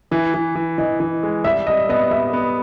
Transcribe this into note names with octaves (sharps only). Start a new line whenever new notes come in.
E3 E5
E3
E3
E3 D#5
E3
G#3
G3 E5
G3 D#5
B3 D#5
G3 E5
B3